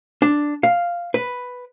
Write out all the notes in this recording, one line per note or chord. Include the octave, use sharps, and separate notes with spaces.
D4
F5
B4